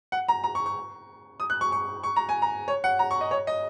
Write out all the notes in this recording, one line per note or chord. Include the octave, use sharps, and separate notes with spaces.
F#5
A#5
A#5
C#6
C#6
D#6
F#6
C#6
C#6
C#6
A#5
G#5
A#5
C#5
F#5
A#5
C#6
D#5
C#5
D#5